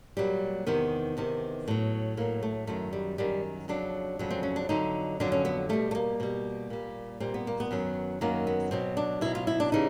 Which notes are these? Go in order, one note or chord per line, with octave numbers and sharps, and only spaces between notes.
A#2 F#3 G3
E2 C3 D#3 B3
E2 C3 D#3
A2 F#3
A2 F#3 A#3
A3
F#2 D#3 F#3 A3
G3
F#2 D#3 F#3 G3
F2 C#3 F#3 D4
F2 C#3 F#3
C4
C#4
D4
F2 D3 F#3 D#4
F2 D3 F#3 D4
C#4
B3
B2 G3 A3
A3
A#3
B2 G3
A#2 G3
A#2 G3 C4
B3
A#3
B3
F#2 D#3 F#3
F#2 D#3 F#3 A#3
B3
B2 F#3 C4
D4
B2 F#3 E4
F4
E4
D4
C#3 E3 G3 D#4